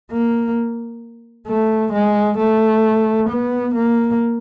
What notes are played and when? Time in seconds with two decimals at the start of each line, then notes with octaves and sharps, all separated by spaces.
0.11 A#3
1.48 A3
1.93 G#3
2.38 A3
3.30 B3
3.75 A#3